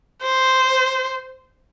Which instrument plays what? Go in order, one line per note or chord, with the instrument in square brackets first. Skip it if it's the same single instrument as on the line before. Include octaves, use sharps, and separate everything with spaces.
[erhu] C5